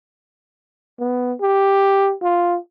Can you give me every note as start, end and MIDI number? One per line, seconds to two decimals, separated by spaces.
1.00 1.33 59
1.42 2.13 67
2.22 2.57 65